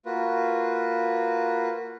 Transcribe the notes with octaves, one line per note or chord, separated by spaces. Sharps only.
A#3 F4 F#4 B4